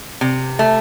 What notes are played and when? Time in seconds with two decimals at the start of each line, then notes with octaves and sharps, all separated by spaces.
0.21 C3
0.59 A3